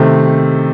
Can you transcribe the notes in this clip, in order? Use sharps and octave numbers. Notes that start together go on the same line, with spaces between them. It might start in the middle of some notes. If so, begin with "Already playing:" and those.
Already playing: C3 D#3 A3 C4